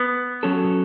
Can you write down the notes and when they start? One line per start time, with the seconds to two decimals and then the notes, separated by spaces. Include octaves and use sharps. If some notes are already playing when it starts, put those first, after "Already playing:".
Already playing: B3
0.43 F#3 C#4 F#4 A4